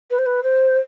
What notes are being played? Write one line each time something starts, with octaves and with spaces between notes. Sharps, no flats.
B4
C5
B4
C5